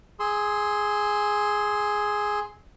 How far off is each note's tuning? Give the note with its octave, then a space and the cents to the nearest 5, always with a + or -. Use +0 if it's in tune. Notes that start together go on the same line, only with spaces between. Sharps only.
G#4 +0 C6 +0 E6 -30